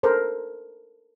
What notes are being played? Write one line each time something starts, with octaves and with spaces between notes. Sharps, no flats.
A4 A#4 C5